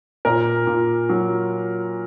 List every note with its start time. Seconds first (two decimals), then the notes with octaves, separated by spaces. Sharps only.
0.25 A#2 A#4
0.67 A#2
1.09 F#3